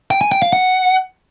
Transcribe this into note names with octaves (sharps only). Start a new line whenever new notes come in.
G5
G#5
G5
F5
F#5